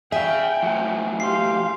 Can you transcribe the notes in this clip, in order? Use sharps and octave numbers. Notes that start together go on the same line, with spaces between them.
G#4 E5 F5 G5 G#5
A2 F3 F#3
G4 F5 C6 C7